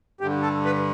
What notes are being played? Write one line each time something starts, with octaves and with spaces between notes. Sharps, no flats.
G2 D3 G4
A4
B4